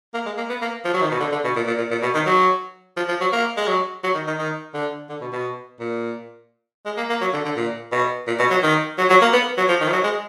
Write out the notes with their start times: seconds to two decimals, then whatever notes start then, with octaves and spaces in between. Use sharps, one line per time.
0.14 A#3
0.26 G#3
0.37 A#3
0.49 B3
0.62 A#3
0.85 F3
0.94 F#3
1.02 D#3
1.11 B2
1.20 D3
1.32 D3
1.44 B2
1.56 A#2
1.67 A#2
1.78 A#2
1.91 A#2
2.02 B2
2.15 D#3
2.26 F#3
2.97 F3
3.08 F3
3.21 F#3
3.33 A#3
3.57 G#3
3.67 F#3
4.04 F#3
4.15 D#3
4.27 D#3
4.39 D#3
4.74 D3
5.09 D3
5.21 B2
5.33 B2
5.80 A#2
6.85 G#3
6.97 A#3
7.10 A#3
7.21 F#3
7.33 D3
7.45 D3
7.56 A#2
7.92 B2
8.27 A#2
8.40 B2
8.50 F#3
8.63 D#3
8.98 F#3
9.10 F#3
9.21 A#3
9.33 B3
9.57 F#3
9.69 F3
9.81 D#3
9.88 F3
9.93 F#3
10.04 G#3